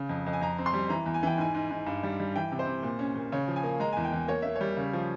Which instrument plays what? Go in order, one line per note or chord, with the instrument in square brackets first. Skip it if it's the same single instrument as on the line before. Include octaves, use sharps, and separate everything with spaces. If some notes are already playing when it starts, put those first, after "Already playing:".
Already playing: [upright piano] C#3
F2
F2
G#5
F2 A#5
C4
C6
G3
E3 A#5
E2
G#5
E3 G5
G#2 G#5
G#2
G#2
G2
G3
G3
E3 G5
C3
C5
C3
A#2
C#4
A#2
C#3 C#5
F3
G#5
A#3
G#3 A#5
E2 G#5
G5
E2
A#3 C#5
A#3 E5
C#5
G3
C#3
F3